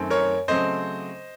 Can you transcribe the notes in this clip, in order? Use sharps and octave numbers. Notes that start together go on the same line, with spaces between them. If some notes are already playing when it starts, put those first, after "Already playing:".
Already playing: F#2 D#3 A3 C4
A#4 C#5
C#3 F#3 A3 C4 C5 D#5